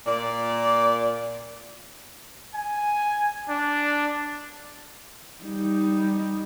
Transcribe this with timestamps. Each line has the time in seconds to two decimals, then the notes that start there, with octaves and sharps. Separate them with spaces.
0.07 A#2 D5
2.55 G#5
3.49 D4
5.44 G3 D#4